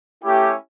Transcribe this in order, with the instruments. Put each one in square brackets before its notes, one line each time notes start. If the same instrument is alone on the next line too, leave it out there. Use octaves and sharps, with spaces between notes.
[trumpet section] A3 C#4 E4 G4